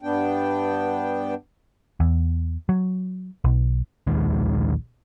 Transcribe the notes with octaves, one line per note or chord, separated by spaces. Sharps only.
G2 B3 D4 G5
E2
F#3
B1
A#1 D#2 D#3 G#3